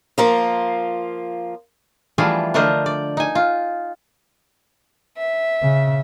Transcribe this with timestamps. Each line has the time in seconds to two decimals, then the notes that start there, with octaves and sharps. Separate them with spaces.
0.18 F3 A#3 F4
2.18 E3 F3 G3 A3 F4 G#4
2.54 D3 A3 D4 A#4 C5 D#5
2.86 D5
3.17 D#4 G#5
3.35 F4
5.17 E5
5.62 C#3